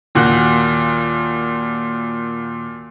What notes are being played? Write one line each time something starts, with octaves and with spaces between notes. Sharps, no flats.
D#2 A#2 F#4 F#6